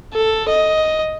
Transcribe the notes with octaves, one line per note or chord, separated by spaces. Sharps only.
A4
D#5